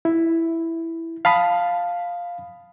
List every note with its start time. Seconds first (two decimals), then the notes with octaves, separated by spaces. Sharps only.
0.05 E4
1.25 F5 A5 B5 D#6